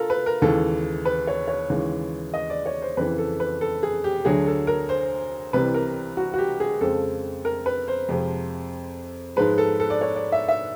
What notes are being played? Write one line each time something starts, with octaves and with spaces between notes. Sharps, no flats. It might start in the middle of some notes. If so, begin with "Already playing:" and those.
Already playing: F4 A4 A#4
B4
A#4
D#2 C#3 E3 G#3 A4
B4
C#5
C#5
D#2 C#3 E3 G#3
D#5
D5
C#5
C5
F2 C#3 E3 B4
A4
B4
A4
G#4
G4
D2 D3 F#3 G#4
A4
A#4
C5
C2 C3 E3 G3 B4
A#4
F#4
F#4
G4
G#4
F2 C#3 F3 G#3 A4
A#4
B4
C5
F2 C3 F3 G#3
G#2 F3 G#3 B4
A4
A4
D5
C#5
D5
E5
E5